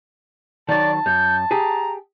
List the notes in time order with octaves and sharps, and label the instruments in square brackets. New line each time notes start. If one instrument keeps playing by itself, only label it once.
[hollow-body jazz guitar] D#3 F#3 [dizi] D5 [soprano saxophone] A5
[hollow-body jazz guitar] F#2 [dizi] G6
[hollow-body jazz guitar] G4 G#4 [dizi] A#5